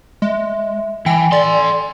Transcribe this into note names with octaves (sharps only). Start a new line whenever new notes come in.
G#3 E5
E3 G5 G#5
A4 D5 C6